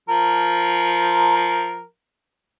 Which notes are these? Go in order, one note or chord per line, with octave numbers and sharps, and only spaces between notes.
F3 A#4